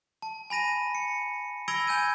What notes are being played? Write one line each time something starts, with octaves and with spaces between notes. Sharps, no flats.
A5
G#5 B5 A#6 D#7
C#7
B5 E6 G#6 A#6 D7 G7
G#5 G6 G#6 D#7